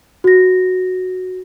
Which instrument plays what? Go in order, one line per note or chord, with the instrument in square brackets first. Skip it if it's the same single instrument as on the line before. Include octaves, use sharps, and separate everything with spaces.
[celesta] F#4 A#6